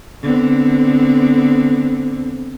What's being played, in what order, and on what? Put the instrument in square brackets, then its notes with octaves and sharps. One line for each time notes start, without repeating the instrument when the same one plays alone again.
[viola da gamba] D3 B3 C4